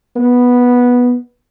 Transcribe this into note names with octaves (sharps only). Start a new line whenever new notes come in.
B3